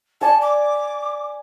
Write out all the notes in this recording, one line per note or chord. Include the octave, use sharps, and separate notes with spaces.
D5 G#5 A5
D6